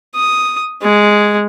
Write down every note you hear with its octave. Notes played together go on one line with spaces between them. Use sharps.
D#6
G#3